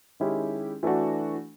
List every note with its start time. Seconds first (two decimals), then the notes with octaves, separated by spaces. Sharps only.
0.20 D#3 G#3 C#4 E4 G4
0.83 E3 A3 D4 F#4